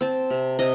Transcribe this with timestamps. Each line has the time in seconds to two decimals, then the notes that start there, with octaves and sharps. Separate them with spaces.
0.01 C4 A5
0.30 C3
0.59 C3 D#5